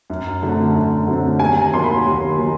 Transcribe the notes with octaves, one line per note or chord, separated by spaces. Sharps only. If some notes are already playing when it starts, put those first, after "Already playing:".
F#2
D3 F#3 A3 C4
F#2
D3 F#3 A3 C4
D#2 G#5
A#5
D#3 F#3 A#3 C6
B5
D#2
D#3 F#3 A#3